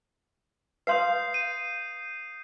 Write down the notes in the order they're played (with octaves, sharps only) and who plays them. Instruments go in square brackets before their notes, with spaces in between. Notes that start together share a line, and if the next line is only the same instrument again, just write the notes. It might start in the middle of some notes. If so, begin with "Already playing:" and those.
[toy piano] B4 F5 C6 [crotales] D#6 G6 C7
[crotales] D#7